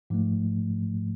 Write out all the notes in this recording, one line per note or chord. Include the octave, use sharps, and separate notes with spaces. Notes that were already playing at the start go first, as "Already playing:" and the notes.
G#2 F3 A3